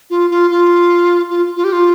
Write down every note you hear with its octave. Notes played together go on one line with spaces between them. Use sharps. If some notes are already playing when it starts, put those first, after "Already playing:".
F4
F4
F4
F4
F4
G4
F4